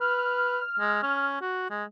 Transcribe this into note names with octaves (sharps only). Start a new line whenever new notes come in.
B4 F6
G#3
C#4
F#4
G#3